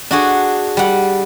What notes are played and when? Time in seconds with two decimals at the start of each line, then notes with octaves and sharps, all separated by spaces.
0.11 D4 F#4 G#4
0.77 G3 F#5